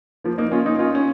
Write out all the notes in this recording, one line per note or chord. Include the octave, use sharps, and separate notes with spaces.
F3 A#3
A#3 D#4
C#4 F4
A#3 D#4
C#4 F4
C#4